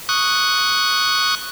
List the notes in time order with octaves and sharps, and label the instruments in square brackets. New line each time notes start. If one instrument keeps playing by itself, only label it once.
[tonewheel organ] C#6 D#6 F#6